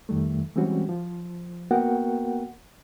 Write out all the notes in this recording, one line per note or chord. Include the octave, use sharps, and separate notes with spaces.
F2 D#3 G3 A3
E3 G3 G#3 C4 C#4 F#4
F3
A#3 B3 F#4 A#4 F#5 G5